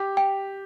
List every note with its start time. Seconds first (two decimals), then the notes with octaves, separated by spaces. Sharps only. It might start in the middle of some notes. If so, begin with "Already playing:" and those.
Already playing: G4
0.17 G5